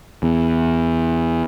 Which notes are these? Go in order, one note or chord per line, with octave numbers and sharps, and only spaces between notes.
E2